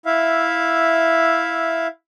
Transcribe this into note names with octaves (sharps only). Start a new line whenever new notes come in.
E4 E5 F5